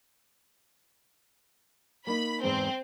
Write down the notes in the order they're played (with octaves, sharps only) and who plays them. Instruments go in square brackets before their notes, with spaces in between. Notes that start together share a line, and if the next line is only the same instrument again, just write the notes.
[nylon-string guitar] A#3 D#4 [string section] B5
[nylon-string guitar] E2 G#2 [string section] C4